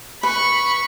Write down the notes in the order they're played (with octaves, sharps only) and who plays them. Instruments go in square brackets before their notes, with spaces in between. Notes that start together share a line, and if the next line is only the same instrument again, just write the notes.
[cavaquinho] B4 [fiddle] B5 C#6